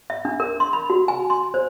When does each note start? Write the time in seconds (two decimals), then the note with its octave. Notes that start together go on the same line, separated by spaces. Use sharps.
0.10 E5
0.25 D4
0.40 A#4
0.60 C6
0.73 B5
0.90 F#4
1.08 G#5
1.30 C6
1.54 C5